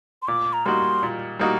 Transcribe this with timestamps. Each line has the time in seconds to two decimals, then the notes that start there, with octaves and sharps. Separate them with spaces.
0.22 C6
0.28 A#2 D6
0.53 A#5
0.66 G3 A#3 D#4 F#4 C6
1.03 A#2
1.39 G3 A#3 D#4 F#4